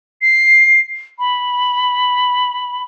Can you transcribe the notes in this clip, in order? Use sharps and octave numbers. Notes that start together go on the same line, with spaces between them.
C7
B5